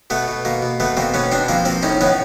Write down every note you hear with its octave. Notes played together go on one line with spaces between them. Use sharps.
B2 A3 B3
B2
B2 A#3
B2
B2 A3 B3
B2 A#3 C4
B2 B3 C#4
B2 C4 D4
F3 A#3 C4
F3 A#3 C4
A2 C#4 D#4
A2 B3 C#4